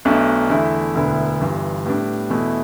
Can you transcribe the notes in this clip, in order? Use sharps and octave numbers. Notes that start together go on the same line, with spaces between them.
B1 B2 A3 D4
E2 D3 A3 E4
E1 D2 D3 B3 E4
G1 G2 E3
A2 G3 B3 D4
E2 B2 A3 E4